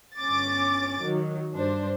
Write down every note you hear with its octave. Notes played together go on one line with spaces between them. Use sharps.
G1 C#4 D6 A6
D#3 F#3
G2 D4 C5